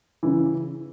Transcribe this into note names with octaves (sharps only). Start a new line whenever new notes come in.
C#3 E3